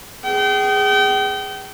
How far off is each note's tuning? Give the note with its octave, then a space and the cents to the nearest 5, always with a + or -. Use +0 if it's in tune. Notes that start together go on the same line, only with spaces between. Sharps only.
G#4 -10 G5 -35